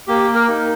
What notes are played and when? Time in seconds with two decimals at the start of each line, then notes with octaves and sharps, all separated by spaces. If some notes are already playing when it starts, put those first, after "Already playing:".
0.08 A#3 G4
0.35 A#4
0.49 D#4